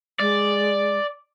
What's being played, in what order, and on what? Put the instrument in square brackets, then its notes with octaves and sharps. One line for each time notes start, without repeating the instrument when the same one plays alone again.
[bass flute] G#3 [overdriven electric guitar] D5